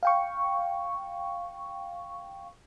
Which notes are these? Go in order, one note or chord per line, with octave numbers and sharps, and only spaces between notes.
F5 G5 C#6